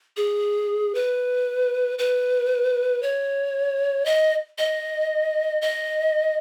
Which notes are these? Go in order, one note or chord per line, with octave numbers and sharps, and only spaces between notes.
G#4
B4
B4
C#5
D#5
D#5
D#5